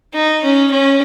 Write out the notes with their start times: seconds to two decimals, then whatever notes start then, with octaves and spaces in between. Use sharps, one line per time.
0.14 D#4
0.43 C#4
0.71 C#4